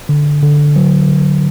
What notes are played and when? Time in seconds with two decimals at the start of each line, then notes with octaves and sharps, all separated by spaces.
0.09 D3
0.42 D3
0.76 F#3
1.08 D3